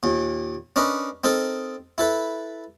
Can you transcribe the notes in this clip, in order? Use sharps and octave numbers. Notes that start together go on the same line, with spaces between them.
D#2 A#2
C#4 D4 A#4 B4 D#5
C4 D#4 A4 A#4
E4 A4 B4